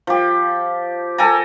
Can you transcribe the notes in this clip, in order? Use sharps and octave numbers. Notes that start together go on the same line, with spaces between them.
F3 G4
A4 G5 G#5 A#5